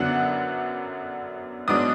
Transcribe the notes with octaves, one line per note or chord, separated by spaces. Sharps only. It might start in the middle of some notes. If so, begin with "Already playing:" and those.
Already playing: F#2 D3 F#3 B3 D4 F#5
G#2 F#3 B3 D4 D#6